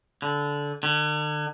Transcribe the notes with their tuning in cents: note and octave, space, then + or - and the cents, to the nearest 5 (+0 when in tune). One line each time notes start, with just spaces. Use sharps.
D3 -20
D3 +40